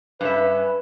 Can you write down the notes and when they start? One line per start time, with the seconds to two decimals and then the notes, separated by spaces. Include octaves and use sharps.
0.21 G2 C#4 B4 E5